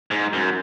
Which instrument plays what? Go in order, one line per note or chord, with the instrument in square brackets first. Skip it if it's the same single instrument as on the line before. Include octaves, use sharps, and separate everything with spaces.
[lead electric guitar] G#2
F#2